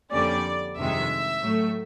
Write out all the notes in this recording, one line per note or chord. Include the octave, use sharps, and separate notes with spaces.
F2 D3 G3 A#3 C#4 D5
G1 F2 C3 D#3 G#3 E5
A2 F#3 A3